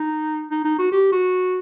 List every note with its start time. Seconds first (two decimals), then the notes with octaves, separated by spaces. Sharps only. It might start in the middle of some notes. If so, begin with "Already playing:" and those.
Already playing: D#4
0.51 D#4
0.65 D#4
0.79 F#4
0.92 G4
1.12 F#4